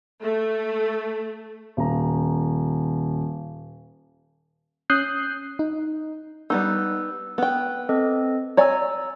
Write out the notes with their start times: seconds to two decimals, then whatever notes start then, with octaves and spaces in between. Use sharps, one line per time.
0.21 A3
1.77 D#1 A#5
4.90 C#4 D#6 F#6 G6 C7
5.59 D#4
6.50 G3 B3 D#4 E6
7.38 B3 G5
7.89 C4 A4 D#5
8.57 C#5 D5 G#5 A#5 E6